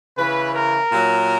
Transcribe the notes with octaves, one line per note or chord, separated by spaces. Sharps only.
C#3 E3 B4
A#4
A#2 F#3